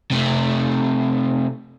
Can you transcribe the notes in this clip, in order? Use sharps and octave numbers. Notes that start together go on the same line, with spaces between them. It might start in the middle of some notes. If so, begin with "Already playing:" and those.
C3 A3